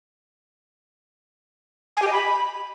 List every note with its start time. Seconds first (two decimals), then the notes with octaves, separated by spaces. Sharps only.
1.97 G#5
2.02 G4
2.07 D#5
2.12 B5